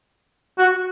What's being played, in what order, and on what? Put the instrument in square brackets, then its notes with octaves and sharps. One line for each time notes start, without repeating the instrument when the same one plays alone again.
[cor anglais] F#4